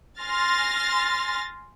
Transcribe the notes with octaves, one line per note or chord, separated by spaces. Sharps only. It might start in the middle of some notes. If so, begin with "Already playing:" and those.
G#5 C6 F6 A6 A#6